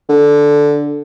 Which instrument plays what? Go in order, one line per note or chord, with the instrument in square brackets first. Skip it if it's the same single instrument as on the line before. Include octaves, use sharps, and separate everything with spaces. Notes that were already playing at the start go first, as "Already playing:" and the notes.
[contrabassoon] D3